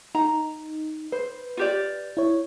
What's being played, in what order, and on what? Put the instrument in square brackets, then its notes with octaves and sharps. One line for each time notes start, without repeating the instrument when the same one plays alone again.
[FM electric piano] D#4 [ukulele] A#5
[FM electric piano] B4 [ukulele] C5
[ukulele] F4 G4 D5
[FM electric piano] E4 C#5